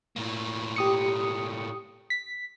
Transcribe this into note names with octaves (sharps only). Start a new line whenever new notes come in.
A2 A#3
G4 D#6 C#7
B6